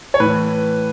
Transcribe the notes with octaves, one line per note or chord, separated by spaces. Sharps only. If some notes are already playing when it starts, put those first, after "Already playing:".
C#5
A2 E3 B4